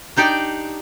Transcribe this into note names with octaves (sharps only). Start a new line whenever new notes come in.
D4 D#4 G4 D5 G5